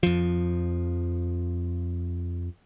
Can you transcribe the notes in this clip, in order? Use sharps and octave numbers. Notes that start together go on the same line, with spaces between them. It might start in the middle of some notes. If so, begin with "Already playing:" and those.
F2 F3